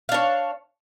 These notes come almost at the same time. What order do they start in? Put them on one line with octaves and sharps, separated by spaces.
F5 D4 C#5